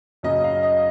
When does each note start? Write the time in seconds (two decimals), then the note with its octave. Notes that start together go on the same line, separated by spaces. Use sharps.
0.23 F#2 C#3 F#3 D#5
0.44 F5
0.63 D#5